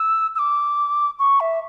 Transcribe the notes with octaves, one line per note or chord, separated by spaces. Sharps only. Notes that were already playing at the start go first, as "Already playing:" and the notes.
Already playing: E6
E6
D6
C#6
E5